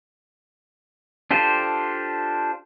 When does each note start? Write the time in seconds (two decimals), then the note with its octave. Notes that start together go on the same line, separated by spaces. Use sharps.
1.31 D4 F4 G4 A4 C5